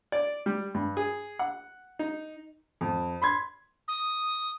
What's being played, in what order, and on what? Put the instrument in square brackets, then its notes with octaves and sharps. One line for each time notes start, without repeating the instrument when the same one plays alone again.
[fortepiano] D5
G3
G2
G#4
F#5
D#4
[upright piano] F2
B5 C6 G#6
[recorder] D#6